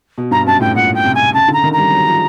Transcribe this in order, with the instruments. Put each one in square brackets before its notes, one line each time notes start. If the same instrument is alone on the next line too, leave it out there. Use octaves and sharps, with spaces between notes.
[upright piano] B2
[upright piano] G2 [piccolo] A#5
[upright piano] F#2 [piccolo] A5
[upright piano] A2 [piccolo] G5
[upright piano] A#2 [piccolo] F#5
[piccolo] G5
[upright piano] C3
[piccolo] G#5
[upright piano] C#3 [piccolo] A5
[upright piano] D3 [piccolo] A#5
[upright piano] D#3
[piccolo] A#5
[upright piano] G3
F#3
F3